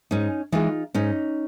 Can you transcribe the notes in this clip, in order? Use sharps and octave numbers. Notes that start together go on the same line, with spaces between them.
G#2 C#4 D#4
E3 G#3 D#4 F4
G#2 C#4 D#4